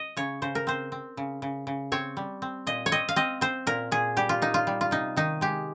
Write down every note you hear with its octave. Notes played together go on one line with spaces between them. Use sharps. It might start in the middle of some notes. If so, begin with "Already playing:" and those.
Already playing: D#5
C#3 C#5
C#3 C5
A#4
C4 C5
C4
C#3
C#3
C#3
C4 C#5
G3
C4
A#2 D#5
C#5
C4 D#5
F5
C4 D#5
C4 C5
A#2 A#4
A#2 G#4
G3 G4
F4
A#2 D#4
F4
G3
F4
C3 D#4
D#3 D#4
G#3 G4